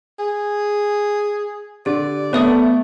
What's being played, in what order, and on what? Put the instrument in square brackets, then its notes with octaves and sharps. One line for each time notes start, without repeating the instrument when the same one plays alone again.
[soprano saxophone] G#4
[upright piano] D3 [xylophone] G4 [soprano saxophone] D5
[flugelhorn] A3 [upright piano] B3 [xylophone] C#5 E5 D#6